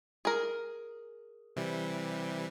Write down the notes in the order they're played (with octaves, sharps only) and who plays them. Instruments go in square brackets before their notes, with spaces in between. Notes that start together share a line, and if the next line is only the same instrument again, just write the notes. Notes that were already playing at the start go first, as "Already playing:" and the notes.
[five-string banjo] G#4 A#4
[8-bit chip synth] C3 E3 G3